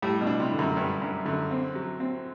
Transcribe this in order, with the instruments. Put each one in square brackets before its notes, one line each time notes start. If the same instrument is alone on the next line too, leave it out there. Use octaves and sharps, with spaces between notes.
[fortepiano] A2 [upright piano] G3
[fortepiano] B2
[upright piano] D4
[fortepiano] C3
[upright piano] D3
[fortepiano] F#2
[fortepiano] G2 [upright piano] G3
[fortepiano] F#2 [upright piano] D4
[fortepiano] F#2 [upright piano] D3
[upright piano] C4
F#3
C4